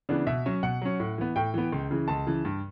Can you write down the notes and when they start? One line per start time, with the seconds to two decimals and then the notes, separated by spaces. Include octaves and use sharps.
0.09 C#3 E3 B3 D4
0.27 B2 E5
0.46 F#3 C#4
0.63 B2 F#5
0.82 F#3 C#4
1.00 A2
1.18 E3 B3
1.36 A2 G5
1.54 E3 B3
1.72 C#2
1.91 C#3 E3
2.08 C#2 A5
2.27 C#3 E3
2.45 G2